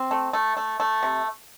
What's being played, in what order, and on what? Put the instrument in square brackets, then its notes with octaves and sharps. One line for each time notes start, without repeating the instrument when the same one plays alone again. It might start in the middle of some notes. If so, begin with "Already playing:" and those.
Already playing: [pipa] C4
A3
A3
A3
A3
C3